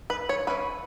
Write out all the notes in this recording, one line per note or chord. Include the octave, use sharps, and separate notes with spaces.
B4
C#5
E3 C#4 B4